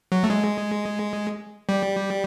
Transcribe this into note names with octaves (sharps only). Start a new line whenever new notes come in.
F#3
A3
G#3
G3